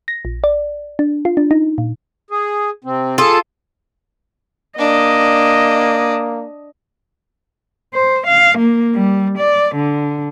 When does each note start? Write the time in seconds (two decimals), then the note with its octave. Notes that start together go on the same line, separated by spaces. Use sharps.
0.08 A#6
0.25 A#1
0.44 D5
0.99 D4
1.25 F4
1.37 D4
1.51 D#4
1.78 A#2
2.31 G#4
2.84 C3 C4
3.18 F4 G#4 A4
4.79 A#3 D4 D#5
7.94 C5
8.27 F5
8.58 A#3
8.95 G3
9.38 D5
9.76 D3